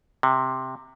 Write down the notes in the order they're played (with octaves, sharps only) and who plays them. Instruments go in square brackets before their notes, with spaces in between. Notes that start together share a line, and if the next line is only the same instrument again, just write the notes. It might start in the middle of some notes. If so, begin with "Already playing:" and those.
[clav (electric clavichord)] C3